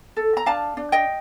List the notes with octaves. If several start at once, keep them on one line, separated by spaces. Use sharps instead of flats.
A4
A#5
D4 F5 A5
D4
D#5 G5